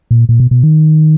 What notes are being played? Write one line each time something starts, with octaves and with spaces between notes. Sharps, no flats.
A#2
A#2
B2
B2
D#3